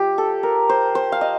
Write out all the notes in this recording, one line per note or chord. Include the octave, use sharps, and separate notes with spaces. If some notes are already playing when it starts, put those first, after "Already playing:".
Already playing: F3 G4
A4
A#4
C5
C5
F5
D#5